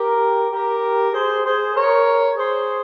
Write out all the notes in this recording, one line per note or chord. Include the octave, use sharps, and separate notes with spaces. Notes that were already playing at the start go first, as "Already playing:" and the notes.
Already playing: G4 A#4
G4 A#4
G#4 C5
G#4 C5
A#4 C#5
G#4 C5